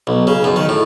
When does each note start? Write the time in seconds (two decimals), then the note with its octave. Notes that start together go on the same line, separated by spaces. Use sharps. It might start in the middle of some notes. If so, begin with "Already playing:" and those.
0.07 B1
0.27 C#3
0.44 F#2
0.56 D#3
0.69 A2